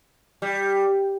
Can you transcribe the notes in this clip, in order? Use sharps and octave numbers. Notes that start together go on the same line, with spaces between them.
G3